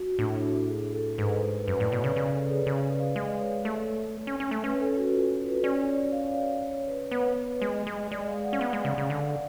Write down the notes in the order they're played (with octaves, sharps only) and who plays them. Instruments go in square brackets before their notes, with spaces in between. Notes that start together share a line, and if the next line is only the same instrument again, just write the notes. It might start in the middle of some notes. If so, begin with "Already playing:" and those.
Already playing: [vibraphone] F#4
[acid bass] A2 [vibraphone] D4
[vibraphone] D4
G#4
A4
[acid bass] G#2 [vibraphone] B4
[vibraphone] B4
[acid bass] F#2 [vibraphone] B4
[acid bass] A2 [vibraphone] D5
[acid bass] B2 [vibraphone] C#5
[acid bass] C#3
[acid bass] C#3 [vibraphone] B4
[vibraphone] A4
G#4
[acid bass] C#3 [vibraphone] B4
[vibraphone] D5
F5
[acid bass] G#3
[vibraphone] C#5
[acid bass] A3
C#4
C#4
A3
[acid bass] C#4 [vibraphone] B4
[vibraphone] A4
F#4
F4
B4
[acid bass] C#4 [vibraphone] D5
[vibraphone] C#5
F5
C#5
B4
[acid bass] B3 [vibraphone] B4
[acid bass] G#3
G#3
[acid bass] G#3 [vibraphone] D5
[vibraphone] F5
F#5
[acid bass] C#4
B3
G#3
C#3
C#3
D3